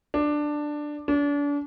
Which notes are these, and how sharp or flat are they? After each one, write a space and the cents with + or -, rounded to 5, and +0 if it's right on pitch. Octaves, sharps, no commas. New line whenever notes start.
D4 +10
D4 -35